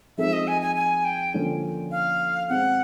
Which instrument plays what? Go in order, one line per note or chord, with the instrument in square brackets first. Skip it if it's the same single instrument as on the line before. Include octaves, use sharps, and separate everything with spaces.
[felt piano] F3 G#3 C4 D#4 G#4 [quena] E5
[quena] D#5
G#5
G#5
G#5
G5
[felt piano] D3 F3 A#3 C#4
[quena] F5
[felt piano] B2 G#3 C4 [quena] F#5